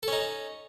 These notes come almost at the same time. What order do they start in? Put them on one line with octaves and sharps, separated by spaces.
A4 C#4 D#4